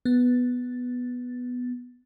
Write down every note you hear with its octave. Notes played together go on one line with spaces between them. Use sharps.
B3 A6